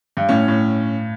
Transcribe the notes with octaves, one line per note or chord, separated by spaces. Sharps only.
G2
A2 C#4
A2